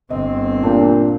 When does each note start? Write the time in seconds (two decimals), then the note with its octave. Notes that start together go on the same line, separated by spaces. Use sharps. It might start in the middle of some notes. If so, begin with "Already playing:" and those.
0.10 G1 C4 D#5
0.63 A#2 D4 G4